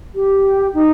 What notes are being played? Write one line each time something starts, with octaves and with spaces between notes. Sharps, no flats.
G4
D#4